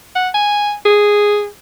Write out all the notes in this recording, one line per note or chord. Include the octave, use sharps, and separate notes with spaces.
F#5
G#5
G#4